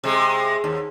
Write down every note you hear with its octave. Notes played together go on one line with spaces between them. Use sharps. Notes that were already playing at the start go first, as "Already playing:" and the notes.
C3 G#3
D#2